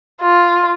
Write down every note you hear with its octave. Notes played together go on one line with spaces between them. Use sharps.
F4